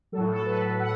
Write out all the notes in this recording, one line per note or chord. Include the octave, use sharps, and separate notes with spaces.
F#3 A4
A2
A4
B4
F#5